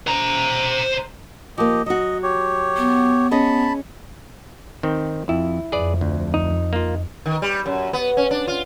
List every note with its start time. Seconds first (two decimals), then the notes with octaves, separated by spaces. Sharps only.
0.07 C5 A#5
1.58 F3 A#3 G4 D#5
1.86 F#3 F#4 D#5
2.23 G4 C#5
2.77 B3
3.31 C#4 G#4 D#5 A5 B5
4.83 D#3 C4
5.29 F2 E4
5.72 F2 G#4 B4 D5
6.01 D2
6.34 D#4
6.73 A#3 F4
7.26 D#3
7.42 G3
7.66 F#2
7.93 B3
8.17 C#4
8.31 D4
8.48 F4